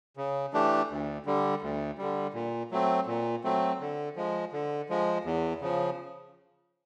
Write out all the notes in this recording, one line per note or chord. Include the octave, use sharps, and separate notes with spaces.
C#3
E3 A3 D4 G4
D2
D3 G3
D2
D3 G3
A#2
F#3 A3 C4
A#2
F#3 A3 C4
D3
F3 G#3
D3
F3 G#3
E2
C#3 F3